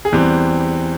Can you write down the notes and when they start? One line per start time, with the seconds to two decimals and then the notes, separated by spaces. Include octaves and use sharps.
0.05 G#4
0.12 E2 E3 G3 C4 G4